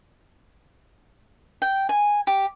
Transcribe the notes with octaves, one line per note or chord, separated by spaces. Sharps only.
G5
G#5
G4